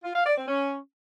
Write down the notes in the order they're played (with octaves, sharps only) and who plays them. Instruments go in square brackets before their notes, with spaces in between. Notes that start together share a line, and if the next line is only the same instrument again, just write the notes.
[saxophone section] F4
F5
D5
C4
C#4